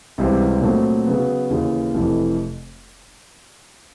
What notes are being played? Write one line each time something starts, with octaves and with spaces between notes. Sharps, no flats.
C#2 C3 E3 G3 C4
A#2 F#3 A3 C4 D#4
C#3 F#3 B3
D#2 C#3 E3
F1 F2 C3 E3